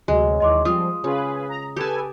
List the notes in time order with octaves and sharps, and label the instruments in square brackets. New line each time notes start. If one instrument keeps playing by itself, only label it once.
[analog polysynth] D2 C3 F#3 [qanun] G#3
[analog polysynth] D#2 E3 F#3 [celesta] D#5 C6 D6
[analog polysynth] F3 G3 C4 [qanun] F4 [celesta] D#6
[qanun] C#3 [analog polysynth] F4 G#4 B4
[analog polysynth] A#5
[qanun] G4 A5 [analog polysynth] A4 B4 G#5